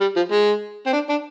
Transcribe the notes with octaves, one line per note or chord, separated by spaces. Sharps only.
G3
F3
G#3
C4
D4
D4